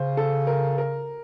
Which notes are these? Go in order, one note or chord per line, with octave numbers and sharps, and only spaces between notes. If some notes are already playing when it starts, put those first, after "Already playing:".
Already playing: C#3 C5
A4
A#4
A#4